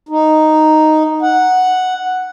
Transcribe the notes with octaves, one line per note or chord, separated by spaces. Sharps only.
D#4
F#5